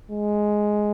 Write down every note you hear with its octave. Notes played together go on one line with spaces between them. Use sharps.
G#3